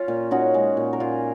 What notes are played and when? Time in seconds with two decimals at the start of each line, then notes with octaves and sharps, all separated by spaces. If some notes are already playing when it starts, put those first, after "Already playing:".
Already playing: C#4 F4
0.08 A#2
0.31 C#4 D#4 F#4
0.54 G#3
0.77 A#2
0.93 A#4
1.00 A#2 F4 G#4